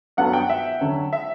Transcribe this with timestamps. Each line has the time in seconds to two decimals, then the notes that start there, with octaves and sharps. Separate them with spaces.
0.17 G2 F#3 B3 F#4 A4 F#5
0.33 G5
0.49 E5
0.81 D3 F#3 C#4 F#4
1.13 E5